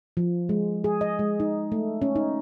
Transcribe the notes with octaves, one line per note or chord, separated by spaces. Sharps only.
F3
G#3
G#4
D#5
G#3
D#4
A3
C#4
D#4